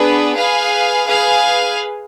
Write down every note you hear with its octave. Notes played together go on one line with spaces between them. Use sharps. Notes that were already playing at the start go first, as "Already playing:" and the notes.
Already playing: B3 D4 G#4 B4
G#4 B4 F5 G#5
G#4 B4 F5 G#5